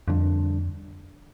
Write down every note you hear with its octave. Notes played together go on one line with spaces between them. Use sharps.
F2 D3 G3 D4